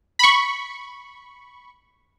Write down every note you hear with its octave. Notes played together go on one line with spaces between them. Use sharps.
B5 C#6